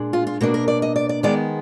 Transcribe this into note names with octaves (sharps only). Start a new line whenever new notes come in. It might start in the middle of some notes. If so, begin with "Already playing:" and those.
Already playing: A#2 G#3 D4
F4
F4
B2 A#3 D4 F#4
A#4
D5
D#5
D5
D5
D#3 G#3 B3 D5